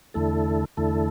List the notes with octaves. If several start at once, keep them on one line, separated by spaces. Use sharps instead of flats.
E2 D3 A3 E4 A4
E2 D3 A3 E4 A4